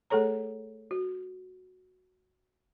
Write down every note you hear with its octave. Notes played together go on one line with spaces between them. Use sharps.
A3 G#4 A4 C#5 A#5
F#4